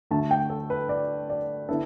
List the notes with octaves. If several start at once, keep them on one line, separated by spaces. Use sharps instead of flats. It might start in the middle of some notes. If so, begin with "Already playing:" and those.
D2 D3 A3 A5
G5
A4
B4
D5
D5
D3 B3 E4 A4